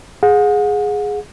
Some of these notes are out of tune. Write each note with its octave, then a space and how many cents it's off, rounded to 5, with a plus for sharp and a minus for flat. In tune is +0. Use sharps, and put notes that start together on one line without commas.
G#4 +0 F#5 -40